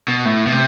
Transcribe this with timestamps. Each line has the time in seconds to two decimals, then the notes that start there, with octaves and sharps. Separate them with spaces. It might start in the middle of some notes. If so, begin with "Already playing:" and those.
0.08 B2
0.25 A2
0.47 B2
0.52 C3